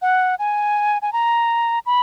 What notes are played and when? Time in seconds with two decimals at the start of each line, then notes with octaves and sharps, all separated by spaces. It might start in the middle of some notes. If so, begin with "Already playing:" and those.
0.02 F#5
0.39 G#5
1.02 G#5
1.13 A#5
1.86 B5